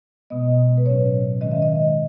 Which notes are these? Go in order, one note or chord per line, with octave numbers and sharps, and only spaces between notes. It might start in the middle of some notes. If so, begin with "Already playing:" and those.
B2 G#3 B3 D#5
B4
A2 F#3 C#4 C#5
D#3 G#3 C#4 D#5
E5
D#5